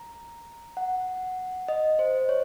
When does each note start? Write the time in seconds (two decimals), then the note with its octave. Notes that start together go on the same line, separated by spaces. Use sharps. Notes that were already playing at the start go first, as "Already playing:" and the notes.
Already playing: A#5
0.77 F#5
1.68 D#5
1.99 C5
2.29 C#5